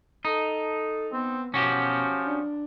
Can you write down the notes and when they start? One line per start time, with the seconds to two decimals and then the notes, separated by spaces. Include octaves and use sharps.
0.25 D#4 A4
1.13 B3 C4
1.54 B2 F3 C#4 F#4 G4
2.25 D4